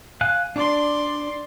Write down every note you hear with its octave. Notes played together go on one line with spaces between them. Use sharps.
F5 G#5 F#6
D4 D5 C6